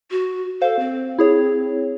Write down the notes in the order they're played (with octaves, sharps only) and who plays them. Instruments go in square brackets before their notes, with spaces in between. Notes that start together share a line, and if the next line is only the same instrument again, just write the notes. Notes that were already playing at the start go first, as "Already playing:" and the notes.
[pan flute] F#4
[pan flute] A4 [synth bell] C5 F5
[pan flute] C4
[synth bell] E4 G#4 C#5